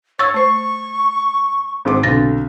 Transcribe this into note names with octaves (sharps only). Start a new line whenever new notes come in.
C#5 C#6 E6 A6
A3 C5 C#6
G#1 G#2 D6
B1 D3 C4 A6 A#6